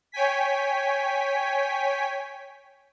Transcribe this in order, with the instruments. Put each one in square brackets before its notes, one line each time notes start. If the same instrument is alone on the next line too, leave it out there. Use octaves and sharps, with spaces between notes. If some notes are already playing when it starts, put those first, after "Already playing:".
[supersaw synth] C#5 G5 G#5 B6